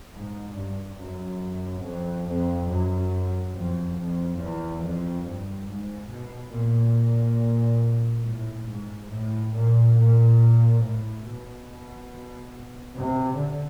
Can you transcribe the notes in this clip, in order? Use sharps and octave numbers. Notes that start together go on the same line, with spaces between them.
G#2
G2
F#2
F2
F2
F#2
F2
F2
E2
F2
G2
G#2
B2
A#2
A2
G#2
A2
A#2
A#2
A2
B2
C3
D3